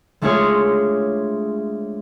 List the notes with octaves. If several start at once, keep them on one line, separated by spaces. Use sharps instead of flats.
G#3 A3 D4 F4 G#4 C#5